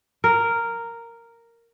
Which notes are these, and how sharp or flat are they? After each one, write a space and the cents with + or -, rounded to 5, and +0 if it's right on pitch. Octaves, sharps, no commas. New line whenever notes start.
A#4 -5